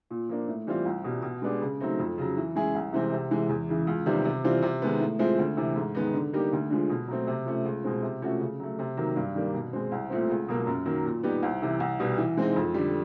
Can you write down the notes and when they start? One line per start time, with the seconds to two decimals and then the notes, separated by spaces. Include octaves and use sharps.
0.10 A#2
0.29 F3 A#3 D4
0.48 A2
0.67 E3 G3 C4 F4
0.85 C2
1.04 B2 G3
1.23 B2
1.42 G#3 B3 D4 G4
1.61 C#3
1.80 F#3 A3 C4 D#4
1.99 F2
2.18 C#3 F#3
2.37 E3
2.56 G#3 C#4 E4 G#4
2.75 C2
2.93 C3 E3 G#3 C4
3.13 C3
3.31 E3 G#3
3.49 E2
3.69 C#3 E3
3.87 C#2
4.06 C3 D#3 G3 B3
4.25 C3
4.44 E3 G3 C4 F4
4.62 C3
4.82 D#3 G#3 B3
5.00 A2
5.19 F3 G#3 C4 E4
5.38 D2
5.57 C3 E3
5.76 G#2
5.95 D#3 G#3 B3 D#4
6.14 D3
6.33 G3 A#3 D#4 G4
6.52 D2
6.70 D3 F3 G#3
6.90 B2
7.08 F#3 A3 C4
7.27 C3
7.46 F3 A3 C#4
7.65 C#2
7.84 B2 G#3 C4
8.03 C3
8.22 F3 A3 C#4 F#4
8.40 C#3
8.60 F#3 A3
8.79 C3
8.97 D#3 F#3 A#3
9.16 G2
9.35 D#3 G3 A#3 D4
9.55 B2
9.73 G#3 C4
9.92 C2
10.10 A#2 F3 A3 C4
10.30 C#2
10.48 B2 F#3 A#3
10.67 F#2
10.86 D#3 F#3 A#3
11.05 A#2
11.23 G3 B3 D#4 G4
11.43 C2
11.62 C3 E3
11.80 C2
12.00 B2 G3 B3
12.18 E3
12.37 G#3 C4 D#4
12.56 F2
12.74 D3 G3